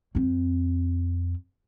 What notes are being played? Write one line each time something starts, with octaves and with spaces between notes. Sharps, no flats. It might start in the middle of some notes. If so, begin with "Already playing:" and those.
F2 C4